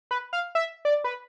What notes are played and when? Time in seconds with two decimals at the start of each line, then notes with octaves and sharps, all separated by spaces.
0.11 B4
0.33 F5
0.55 E5
0.85 D5
1.04 B4